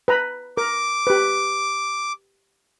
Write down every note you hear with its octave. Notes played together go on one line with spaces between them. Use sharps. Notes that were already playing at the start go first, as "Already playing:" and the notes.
B4 A#5 B5
A#4 D6
G4 B4